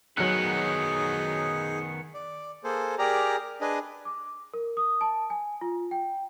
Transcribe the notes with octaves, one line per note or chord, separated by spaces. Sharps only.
D#3 F#3 B3 D#4 G#4 F#6 C#7
D5
A#3 G#4 A4 C5
G4 G#4 A#4 D5 A#5
D4 G#4 B4 D#5
D6
A#4
D#6
A5
G#5
F4
G5